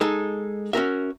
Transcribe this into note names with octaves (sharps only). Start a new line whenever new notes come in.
G#3 D#4 A4
C#4 F#4 A#4 E5